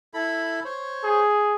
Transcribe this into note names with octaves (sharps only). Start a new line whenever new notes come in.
E4 A4 B5
C5 C#5
G#4